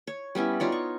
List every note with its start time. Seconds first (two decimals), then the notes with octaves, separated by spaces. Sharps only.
0.07 C#5
0.35 G3 B3 C#4 E4
0.60 D#4 F4 C#5 D5
0.72 C#6